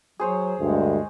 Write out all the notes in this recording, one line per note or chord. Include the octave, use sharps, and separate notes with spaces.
F#3 G#4 C5 C#5
D2 G2 G#3